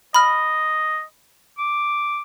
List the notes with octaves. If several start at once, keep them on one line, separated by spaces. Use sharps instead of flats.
D#5 B5 F6
D6